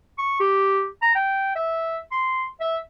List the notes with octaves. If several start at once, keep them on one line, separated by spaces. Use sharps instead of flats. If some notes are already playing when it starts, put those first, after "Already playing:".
C#6
G4
A#5
G5
E5
C6
E5